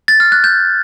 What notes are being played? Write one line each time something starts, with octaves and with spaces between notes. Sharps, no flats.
A6
F6
F#6
G6